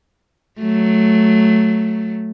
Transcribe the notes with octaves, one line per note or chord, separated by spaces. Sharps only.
F#3 A3